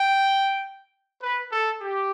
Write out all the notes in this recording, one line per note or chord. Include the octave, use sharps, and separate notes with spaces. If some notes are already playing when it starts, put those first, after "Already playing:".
Already playing: G5
B4
A4
G4